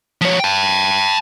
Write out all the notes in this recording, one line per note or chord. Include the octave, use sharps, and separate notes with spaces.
F3 C#5
G5 A5